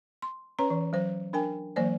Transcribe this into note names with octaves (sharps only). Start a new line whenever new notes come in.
C6
C#4 B4 C#5 A#5
E3
F#3 C5
D4 A#4 G5 G#5
E3 F#3 A#3 C5 D5